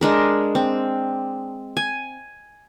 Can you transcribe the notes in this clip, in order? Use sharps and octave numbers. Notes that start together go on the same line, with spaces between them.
G#3 D4 A#4
C4
G#5